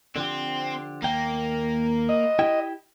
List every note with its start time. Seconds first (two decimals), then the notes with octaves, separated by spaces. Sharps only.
0.16 D3 F3 C4 G4
1.03 D#2 A#3 G5
2.09 D#5
2.39 E4 G4 G5